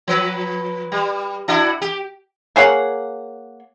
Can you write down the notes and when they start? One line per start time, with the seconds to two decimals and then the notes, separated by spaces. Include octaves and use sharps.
0.08 F3 B4
0.92 G3
1.48 D4 E4 F#4
1.82 G4
2.56 A#3 G#4 C#5 F#5